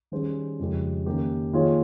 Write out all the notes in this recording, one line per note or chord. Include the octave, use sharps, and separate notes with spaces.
D#3 G3 C#4 G#4 C5
F2 C#3 G#3 C#4 G4
D#3 A#3 C#4 G4 A#4
D#3 A#3 F4 G#4 C#5